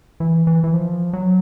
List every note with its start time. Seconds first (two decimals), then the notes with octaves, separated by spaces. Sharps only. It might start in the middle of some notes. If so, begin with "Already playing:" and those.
0.20 E3
0.47 E3
0.64 E3
0.74 F3
1.13 F#3